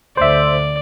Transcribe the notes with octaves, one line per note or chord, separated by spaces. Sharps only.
D2 D3 C5 D5 E5